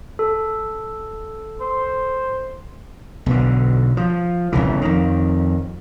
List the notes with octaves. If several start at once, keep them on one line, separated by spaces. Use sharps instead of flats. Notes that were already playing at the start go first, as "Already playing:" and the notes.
A4
C5
B1 D3
F3
G1 C#2 C#3 E3
F2 D#3